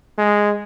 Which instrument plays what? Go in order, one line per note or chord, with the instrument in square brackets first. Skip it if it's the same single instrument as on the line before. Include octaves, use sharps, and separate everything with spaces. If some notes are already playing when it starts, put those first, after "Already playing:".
[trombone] G#3